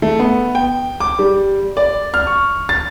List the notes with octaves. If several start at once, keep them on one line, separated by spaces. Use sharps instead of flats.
A3
B3
G5
D6
G3
D5
F6
C#6
A6